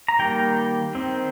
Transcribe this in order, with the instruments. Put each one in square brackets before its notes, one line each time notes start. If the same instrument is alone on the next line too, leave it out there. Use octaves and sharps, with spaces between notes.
[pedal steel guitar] A#5
D#3 G3 A#3 G5
D#3 C4